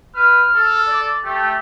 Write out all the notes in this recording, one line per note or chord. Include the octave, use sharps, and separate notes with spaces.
B4 F6
A4
D5
A3 G4